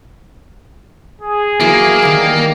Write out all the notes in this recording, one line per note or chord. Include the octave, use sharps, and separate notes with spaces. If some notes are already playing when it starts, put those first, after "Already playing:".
G#4
E3 F#3 A#3
D#3 G3